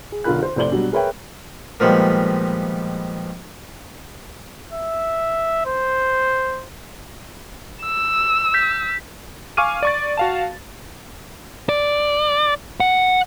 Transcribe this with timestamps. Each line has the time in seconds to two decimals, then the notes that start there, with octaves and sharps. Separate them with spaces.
0.12 G#4
0.24 B1 D3 F4 A#4 B5 F#6
0.43 C5
0.56 F1 A2 C5 D5 F#7 G7
0.72 B2 F#3 G3 D4
0.92 G#4 A#4 B4 C#5 E5 G5
1.80 A#2 D#3 F3 G3 G#3 B3
4.73 E5
5.66 C5
7.83 E6
8.54 G6 B6
9.57 F5 G#5 C#6 D6 F6 D#7
9.83 D5 C#6 A6
10.17 F#4 F5 A5
11.69 D5
12.80 F#5